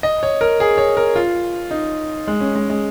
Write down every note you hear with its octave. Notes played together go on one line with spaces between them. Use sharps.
D#5
C#5
A#4
G#4
C#5
A#4
F4
D#4
G#3
C#4
G#3
G#3